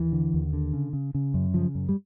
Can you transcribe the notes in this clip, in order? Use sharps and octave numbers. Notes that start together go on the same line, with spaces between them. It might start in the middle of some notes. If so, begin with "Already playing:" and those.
Already playing: D#2 E3
D3
D#2
D3
C#3
C#3
C#3
F#2
C#3 F3
F#2
G3